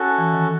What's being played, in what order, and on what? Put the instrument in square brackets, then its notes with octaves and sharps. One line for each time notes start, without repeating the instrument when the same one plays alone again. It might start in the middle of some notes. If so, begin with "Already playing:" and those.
Already playing: [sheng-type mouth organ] C#4 F#4 A4
[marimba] E3
D#3